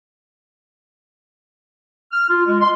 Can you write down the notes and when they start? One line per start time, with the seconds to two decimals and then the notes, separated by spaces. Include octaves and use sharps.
2.11 F6
2.30 F4
2.45 G#3
2.61 C6